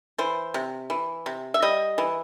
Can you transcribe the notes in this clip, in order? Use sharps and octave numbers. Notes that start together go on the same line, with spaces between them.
E3 C5
C3
E3
C3
E5
G3 D#5
E3